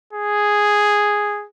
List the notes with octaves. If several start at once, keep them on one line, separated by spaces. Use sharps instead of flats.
G#4